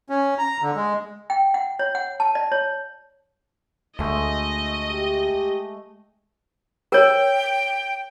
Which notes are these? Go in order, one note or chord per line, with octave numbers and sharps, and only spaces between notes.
C#4
A#5
D3
G#3
G5
F#5
C#5
F#5
A5
D5
C#5
D2 G#3 A3 D#5
G4
A#4 C#5 G5